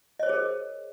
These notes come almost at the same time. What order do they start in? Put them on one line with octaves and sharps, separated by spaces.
D#5 C#5 C5 G#4 A#4